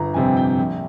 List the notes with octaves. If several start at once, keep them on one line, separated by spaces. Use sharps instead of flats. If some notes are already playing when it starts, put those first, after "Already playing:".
Already playing: G1 A#5
F2 C3 G3 C4 G#5
G5
A#1